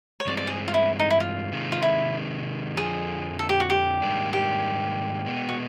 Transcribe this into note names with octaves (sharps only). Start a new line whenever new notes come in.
C#5
G2 E3 G#3 C4 D5
D5
G#4
F4
E4
D#4
E4
F4
C3 D#3 G#3
F4
E4
F2 D3 F3 G#4
A4
G4
F#4
G4
G#2 D#3 G3 A#3 D4
G4
B2 G#3 B3
F#4